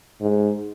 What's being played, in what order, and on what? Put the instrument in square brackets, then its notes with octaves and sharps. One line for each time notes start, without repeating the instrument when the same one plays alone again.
[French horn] G#2